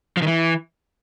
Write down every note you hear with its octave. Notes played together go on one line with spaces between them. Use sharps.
F3
D#3
E3